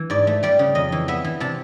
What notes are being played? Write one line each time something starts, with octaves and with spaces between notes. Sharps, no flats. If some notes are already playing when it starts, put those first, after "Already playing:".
Already playing: E3
G#2 D5
A3
G3 D5
C#3
F2 D#5
E3
B3 E5
E3
C3 A5